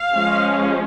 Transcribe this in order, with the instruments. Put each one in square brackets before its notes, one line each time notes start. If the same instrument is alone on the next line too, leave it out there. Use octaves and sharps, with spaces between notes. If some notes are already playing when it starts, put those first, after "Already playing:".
Already playing: [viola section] F5
F3 G#3 C#4